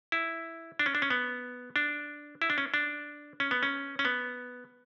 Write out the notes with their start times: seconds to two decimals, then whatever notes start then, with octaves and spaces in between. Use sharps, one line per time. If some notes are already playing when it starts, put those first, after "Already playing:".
0.12 E4
0.79 D4
0.86 C#4
0.95 D4
1.02 C#4
1.10 B3
1.76 D4
2.42 E4
2.50 D4
2.58 C#4
2.74 D4
3.40 C#4
3.51 B3
3.63 C#4
3.99 C#4
4.05 B3